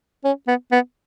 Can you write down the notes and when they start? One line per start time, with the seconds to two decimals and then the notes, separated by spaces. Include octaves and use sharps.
0.25 C#4
0.47 B3
0.72 B3